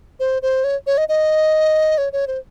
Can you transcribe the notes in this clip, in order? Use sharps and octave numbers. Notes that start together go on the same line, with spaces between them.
C5
C5
C#5
C#5
D#5
D#5
C#5
C#5
C5